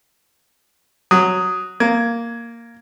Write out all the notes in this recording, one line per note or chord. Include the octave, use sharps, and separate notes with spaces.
F#3 D#6
A#3 G#6